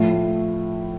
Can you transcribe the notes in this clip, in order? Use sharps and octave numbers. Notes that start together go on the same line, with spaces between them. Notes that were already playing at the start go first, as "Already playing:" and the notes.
Already playing: A2 F3 A3 E4